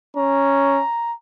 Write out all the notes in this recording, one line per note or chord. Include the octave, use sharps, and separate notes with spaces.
C#4 A#5